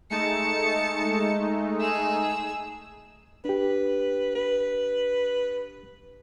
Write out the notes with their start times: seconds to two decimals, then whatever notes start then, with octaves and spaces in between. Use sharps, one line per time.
0.10 G#3 A3 D#4 A5 C#7
1.80 G#4 E6
3.45 D4 G4 B4
4.35 B4